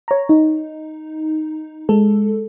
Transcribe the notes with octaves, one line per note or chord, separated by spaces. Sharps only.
C#5 A#5
D#4
G#3 A4